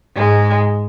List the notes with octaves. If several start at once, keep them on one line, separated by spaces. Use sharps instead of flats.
G#2 G#3